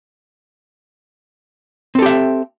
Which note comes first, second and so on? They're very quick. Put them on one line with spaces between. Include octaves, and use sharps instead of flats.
C4 A4 G4 E5